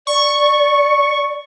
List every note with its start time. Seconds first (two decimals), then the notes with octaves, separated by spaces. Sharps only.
0.07 D5 C#6